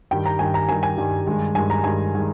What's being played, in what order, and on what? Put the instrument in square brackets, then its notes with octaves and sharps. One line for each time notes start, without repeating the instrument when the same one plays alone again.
[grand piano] G2 D#3 G3 G5
A#5
G2 D#3 G3 G#5
A#5
G2 D#3 G3 G#5
G#5
G2 D#3 G3
G2 D#3 G#3
G2 D#3 G#3 G#5
A#5
G2 D#3 G#3 G#5
D#3 G#3